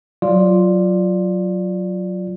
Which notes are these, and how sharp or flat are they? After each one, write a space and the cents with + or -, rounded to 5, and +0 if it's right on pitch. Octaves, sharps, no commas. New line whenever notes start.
F#3 +0 F4 +0 D5 +0